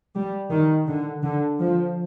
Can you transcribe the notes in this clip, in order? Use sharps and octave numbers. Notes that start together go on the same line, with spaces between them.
G3
D#3
D3
D3
F3